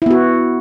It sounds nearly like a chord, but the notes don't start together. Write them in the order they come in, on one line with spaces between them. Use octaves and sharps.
E4 B3 F#4